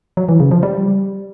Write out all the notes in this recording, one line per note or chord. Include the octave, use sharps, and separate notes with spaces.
F#3
E3
C#3
F3
G3